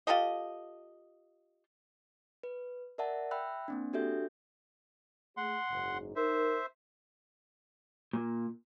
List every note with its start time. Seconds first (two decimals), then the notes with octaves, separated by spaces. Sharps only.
0.07 F4 G4 A4 D#5
2.43 B4
2.98 A#4 D5 E5 F#5 A5
3.31 E5 G5 B5 E6 F#6
3.68 A#3 C4 D4
3.93 D4 F#4 G4 A4 E5 G6
5.37 A3 G#4 F#5 C6
5.71 F#1 G#2
6.16 D#4 A#4 C5 E5
8.13 A#2